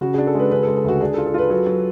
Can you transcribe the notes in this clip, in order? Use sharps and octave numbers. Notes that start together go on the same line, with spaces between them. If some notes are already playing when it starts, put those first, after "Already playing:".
C#3 F#4
D4 G#4
A4
G#3 B4
C#3 B4
A4
G#3
A4
D2 F#4
D4 G#4
A4
F4
A4
F4 B4
F#3 A4
F#3